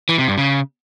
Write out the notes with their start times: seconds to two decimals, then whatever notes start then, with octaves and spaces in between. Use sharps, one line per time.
0.09 E3
0.18 C3
0.28 G2
0.38 C#3